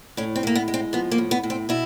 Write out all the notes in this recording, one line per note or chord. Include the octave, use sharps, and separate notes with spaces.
A2 C#4
C4
A2 A#3
B3
G#3
C4
F3 B3
A#3
A2
B3
A2
C4
B2 E4